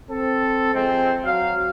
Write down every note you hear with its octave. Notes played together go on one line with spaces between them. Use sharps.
C4 A4
F2 G#3 C4
F#3 F5